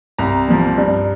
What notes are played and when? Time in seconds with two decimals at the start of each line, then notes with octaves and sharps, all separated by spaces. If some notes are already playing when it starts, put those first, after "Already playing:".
0.18 C2 A#5
0.48 A#2 F3
0.78 G2